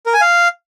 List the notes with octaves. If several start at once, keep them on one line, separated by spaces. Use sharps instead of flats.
A#4
G#5
F5